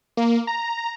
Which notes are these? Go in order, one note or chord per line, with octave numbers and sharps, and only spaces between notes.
A#3
A#5